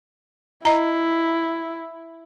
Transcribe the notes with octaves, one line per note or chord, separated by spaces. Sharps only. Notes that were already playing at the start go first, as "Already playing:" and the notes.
E4 D#5 A#5